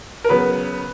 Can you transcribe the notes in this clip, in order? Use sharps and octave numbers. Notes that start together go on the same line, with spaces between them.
A#4
C#3 F#3 B3 B4